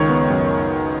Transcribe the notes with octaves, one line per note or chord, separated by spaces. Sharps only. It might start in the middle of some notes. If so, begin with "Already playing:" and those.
Already playing: C#2 D#3 C#5
B3
F#2